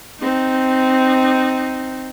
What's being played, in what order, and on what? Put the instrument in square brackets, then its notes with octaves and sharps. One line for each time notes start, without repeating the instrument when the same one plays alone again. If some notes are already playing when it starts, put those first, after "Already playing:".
[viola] C4 D#4